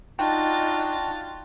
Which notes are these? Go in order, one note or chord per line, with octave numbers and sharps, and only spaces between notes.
D4 D#4 F4 F#4 G5 A6